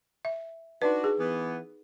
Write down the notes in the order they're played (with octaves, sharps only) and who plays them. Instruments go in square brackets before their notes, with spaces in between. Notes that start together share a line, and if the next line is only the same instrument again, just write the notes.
[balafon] E5
[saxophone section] D4 F#4 [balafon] D#4 B4
[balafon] G#4
[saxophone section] E3 B3